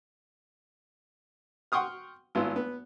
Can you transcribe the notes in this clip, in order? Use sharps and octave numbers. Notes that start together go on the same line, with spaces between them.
F#5 G5 C6 C#6 D#6 F6
G#1 B3 E4 F4
B3